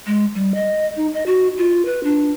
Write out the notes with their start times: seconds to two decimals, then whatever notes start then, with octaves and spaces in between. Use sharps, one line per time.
0.07 G#3
0.35 G3
0.55 D#5
0.96 D#4
1.13 D#5
1.26 F#4
1.58 F4
1.85 B4
2.04 D4